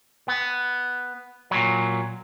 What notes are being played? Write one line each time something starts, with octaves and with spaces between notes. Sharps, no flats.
B3
A#2 F#3